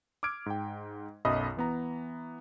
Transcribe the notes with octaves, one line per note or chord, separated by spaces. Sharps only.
D6 E6 F6 G#6 D7
G#2 G5
B1 F#2 D#5 E5 B5 D#6
E3 B3 A#5